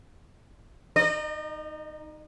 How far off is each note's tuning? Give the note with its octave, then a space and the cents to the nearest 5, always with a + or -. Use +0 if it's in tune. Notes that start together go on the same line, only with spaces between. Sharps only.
D#4 +0 D#5 -40